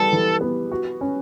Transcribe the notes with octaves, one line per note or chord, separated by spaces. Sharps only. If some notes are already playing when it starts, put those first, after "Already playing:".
Already playing: E3 G3 B3 A4
E3
B3
F#4
C#4